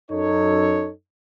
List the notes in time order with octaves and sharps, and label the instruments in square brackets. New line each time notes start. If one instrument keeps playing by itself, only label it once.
[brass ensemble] F#2 D#4 A4 C#5